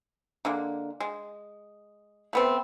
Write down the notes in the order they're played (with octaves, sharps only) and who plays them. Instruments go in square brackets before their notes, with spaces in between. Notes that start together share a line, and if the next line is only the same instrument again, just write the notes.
[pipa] D3 G#3 A#3
G#3
A3 B3 C4